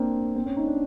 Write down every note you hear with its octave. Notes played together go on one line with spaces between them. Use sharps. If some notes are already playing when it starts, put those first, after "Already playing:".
Already playing: A#3 C4 D4
C4
C#4
D#4
D4